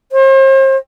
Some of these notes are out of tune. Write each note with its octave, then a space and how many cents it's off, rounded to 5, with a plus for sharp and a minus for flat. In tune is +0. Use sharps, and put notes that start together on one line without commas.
C5 +40